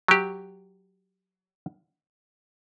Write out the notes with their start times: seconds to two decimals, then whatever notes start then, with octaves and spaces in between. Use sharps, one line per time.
0.08 F#3 G4